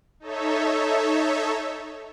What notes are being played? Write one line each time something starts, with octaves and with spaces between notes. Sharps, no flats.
D#4 A4 C#5 E5